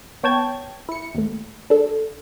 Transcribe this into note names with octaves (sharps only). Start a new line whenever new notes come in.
B3 C#5 G5 A5 G#6
E4 C#7
D#2 A2
D4 A4